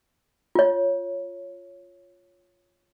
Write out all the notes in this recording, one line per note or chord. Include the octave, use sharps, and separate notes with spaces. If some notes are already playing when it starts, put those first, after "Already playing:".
F4 C#5